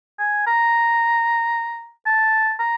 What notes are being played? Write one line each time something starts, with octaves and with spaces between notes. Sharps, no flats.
G#5
A#5
A5
A#5